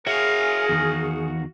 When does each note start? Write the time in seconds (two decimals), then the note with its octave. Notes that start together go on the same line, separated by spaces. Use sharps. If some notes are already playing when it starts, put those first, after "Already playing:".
0.07 F#4 G#4 A#4 C#5 E5 F5
0.69 E2 D#3